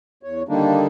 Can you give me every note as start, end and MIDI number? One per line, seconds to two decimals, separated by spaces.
0.23 0.42 40
0.23 0.42 73
0.49 0.87 50
0.49 0.87 51
0.49 0.87 55
0.49 0.87 58
0.49 0.87 62
0.49 0.87 63